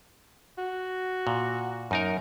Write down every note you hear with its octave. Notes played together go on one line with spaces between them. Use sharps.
F#4
A#2
F#2 D#4 A#4